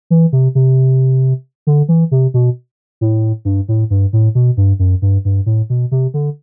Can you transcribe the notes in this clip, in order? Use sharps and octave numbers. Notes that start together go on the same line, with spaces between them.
E3
C3
C3
D3
E3
C3
B2
A2
G2
A2
G2
A2
B2
G2
F#2
G2
G2
A2
B2
C3
D3